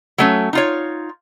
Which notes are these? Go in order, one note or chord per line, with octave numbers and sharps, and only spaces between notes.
F#3 A3 C#4
D#4 F4 C#5